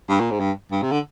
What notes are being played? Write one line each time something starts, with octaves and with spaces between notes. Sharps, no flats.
G2
A#2
G#2
G2
G2
C3
D3